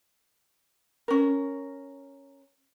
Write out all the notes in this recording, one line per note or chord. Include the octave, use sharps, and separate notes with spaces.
C#4 A#4